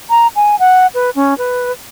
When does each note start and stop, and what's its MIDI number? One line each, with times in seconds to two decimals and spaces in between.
0.10 0.27 82
0.36 0.58 80
0.59 0.87 78
0.94 1.10 71
1.16 1.37 61
1.38 1.72 71